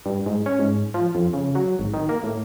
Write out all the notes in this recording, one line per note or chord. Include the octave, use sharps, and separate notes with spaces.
G2
G#2
C#4
G#2
F3
F2
C#3
F#3
G#1
D#3
A#3
A2